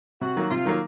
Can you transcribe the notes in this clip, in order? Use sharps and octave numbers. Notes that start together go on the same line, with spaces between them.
C3 F#4
D#3 F#3 A#3
C3 F4
D#3 F#3 A#3